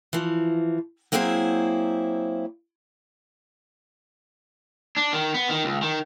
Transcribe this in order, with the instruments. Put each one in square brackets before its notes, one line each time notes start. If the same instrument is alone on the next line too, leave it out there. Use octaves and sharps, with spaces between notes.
[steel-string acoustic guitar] E3 F3
F#3 A#3 C4 E4 G#4 C5
[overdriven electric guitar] D4
D#3
B3
D#3
C#2
D#3